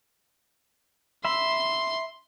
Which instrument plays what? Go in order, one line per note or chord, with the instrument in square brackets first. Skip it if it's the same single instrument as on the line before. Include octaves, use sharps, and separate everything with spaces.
[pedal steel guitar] E5 B5 [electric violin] C6